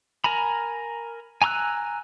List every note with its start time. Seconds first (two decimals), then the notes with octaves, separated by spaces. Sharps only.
0.24 A#4 G#5 A#5 B5
1.42 G#5 A#5 C6 E6 F#6